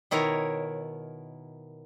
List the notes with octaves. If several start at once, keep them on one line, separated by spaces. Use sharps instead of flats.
B2 D#3 E4 A#4 C#5